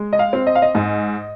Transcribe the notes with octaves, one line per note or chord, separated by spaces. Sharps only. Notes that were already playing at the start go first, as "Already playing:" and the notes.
Already playing: G#3
D#5
F5
C4
D#5
F5
D#5
G#2